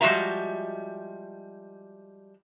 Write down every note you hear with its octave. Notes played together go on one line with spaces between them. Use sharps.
F3 G3 G#3 F#4 E5 A#5